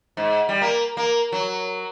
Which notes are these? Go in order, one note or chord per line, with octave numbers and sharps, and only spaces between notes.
G#2
G3
A#3
A#3
F#3